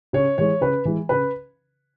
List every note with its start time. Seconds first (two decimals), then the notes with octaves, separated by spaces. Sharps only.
0.13 C#3 C#5
0.38 E3 G#3 C#5
0.61 C#3 B4
0.85 E3 G#3
1.09 C#3 B4